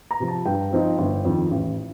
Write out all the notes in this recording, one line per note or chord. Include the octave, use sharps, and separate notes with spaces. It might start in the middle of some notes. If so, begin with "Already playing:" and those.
A#5
C3 F3
A5
G2 G5
F3 C4 D#4
G1
F2 D#3
A1